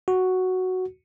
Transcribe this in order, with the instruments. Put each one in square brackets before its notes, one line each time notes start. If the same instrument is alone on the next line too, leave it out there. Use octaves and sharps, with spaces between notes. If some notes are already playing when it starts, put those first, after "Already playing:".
[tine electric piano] F#4